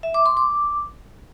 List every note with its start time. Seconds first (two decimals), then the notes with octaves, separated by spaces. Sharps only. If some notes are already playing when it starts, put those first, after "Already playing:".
0.03 E5
0.14 D6
0.26 C6
0.37 D6